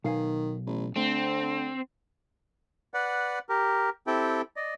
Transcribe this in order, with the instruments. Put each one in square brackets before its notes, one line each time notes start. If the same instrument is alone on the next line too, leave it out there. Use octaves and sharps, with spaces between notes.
[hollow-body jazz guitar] B1 F5 G#5 [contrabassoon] D#3
[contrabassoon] A1
[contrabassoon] D3 [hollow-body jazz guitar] A3 [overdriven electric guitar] C4
[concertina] B4 D5 F#5
G4 A#4
C4 E4 G4 A4 G5
D5 D#5